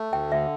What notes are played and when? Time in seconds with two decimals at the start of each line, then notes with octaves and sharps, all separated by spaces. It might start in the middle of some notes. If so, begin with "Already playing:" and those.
Already playing: A3
0.12 D2 G5
0.31 D3 E5